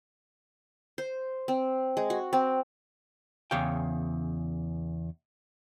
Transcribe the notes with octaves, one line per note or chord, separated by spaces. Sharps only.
C5
C4
G#3
F#4
C4
E2 C#3 C#5 F5 G5